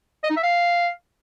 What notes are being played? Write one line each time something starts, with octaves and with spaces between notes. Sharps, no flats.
D#5
D#4
E5
F5